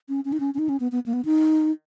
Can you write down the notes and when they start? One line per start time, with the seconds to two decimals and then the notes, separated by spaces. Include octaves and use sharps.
0.09 C#4
0.25 C#4
0.32 D#4
0.40 C#4
0.54 C#4
0.59 D#4
0.69 C#4
0.80 B3
0.92 B3
1.06 A#3
1.13 B3
1.25 D#4